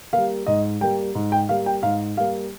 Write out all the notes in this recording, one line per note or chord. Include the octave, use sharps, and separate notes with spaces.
G3 A#3 F5
G#2 D#5
G3 A#3 G5
G#2
G5
G3 A#3 F5
G5
G#2 F5
G3 A#3 F5